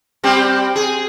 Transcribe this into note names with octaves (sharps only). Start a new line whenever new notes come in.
G3 C4 G4
G#4